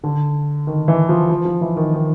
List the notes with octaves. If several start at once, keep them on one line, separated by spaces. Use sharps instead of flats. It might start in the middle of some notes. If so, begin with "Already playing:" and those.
D3
D#3
E3
F3
F3
F3
E3
D#3
D#3